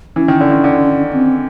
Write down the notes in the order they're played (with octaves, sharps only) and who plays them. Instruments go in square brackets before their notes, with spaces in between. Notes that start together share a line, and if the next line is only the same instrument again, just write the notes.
[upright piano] E3 [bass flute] C#4
[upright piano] D#3
D3
D#3
D3
[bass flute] C4